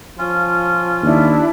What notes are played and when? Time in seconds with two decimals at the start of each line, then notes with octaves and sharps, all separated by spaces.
0.18 F3 C#4 F4
1.03 D#2 D4 E4